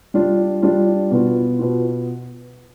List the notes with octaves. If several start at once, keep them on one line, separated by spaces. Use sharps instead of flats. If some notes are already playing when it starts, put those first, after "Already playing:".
G3 D4 F4
G3 D4 F4
B2 B3 F4
B2 B3 F4